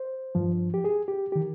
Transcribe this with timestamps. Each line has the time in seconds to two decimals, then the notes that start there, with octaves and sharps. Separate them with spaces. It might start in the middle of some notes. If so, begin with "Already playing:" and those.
Already playing: C5
0.35 G2 F3
0.74 G4
0.84 G#4
1.08 G4
1.32 D#3 G4